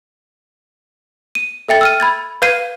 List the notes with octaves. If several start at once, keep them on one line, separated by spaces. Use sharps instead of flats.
D#7
A4 E5 G5 A6
E6 F6 D#7
B5 G#6 A6
B4 F5 G6 G#6 C7 D#7